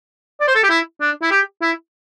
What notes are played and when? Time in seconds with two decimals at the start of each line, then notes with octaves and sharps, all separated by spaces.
0.40 D5
0.48 C5
0.55 A4
0.63 G4
0.70 E4
1.01 D4
1.22 E4
1.31 G4
1.62 E4